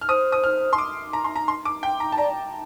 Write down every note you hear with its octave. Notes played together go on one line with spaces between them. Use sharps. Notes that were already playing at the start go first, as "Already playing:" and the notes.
F6
C5 D#6
D#6
F6
C6
D6
A#5
C6
A#5
C6
D6
G5
A#5
A5
D5 A#5